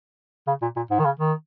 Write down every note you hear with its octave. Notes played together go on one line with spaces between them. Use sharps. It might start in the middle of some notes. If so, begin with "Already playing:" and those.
C#3
A#2
A#2
G#2
D#3
C#3
D#3